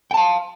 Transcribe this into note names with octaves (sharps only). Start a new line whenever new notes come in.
F5 G5 A5